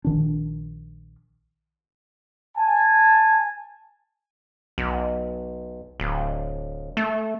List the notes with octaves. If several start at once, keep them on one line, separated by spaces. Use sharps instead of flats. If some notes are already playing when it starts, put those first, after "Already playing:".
A#1 D#3 D4
G#5 A5
B1
D1
A3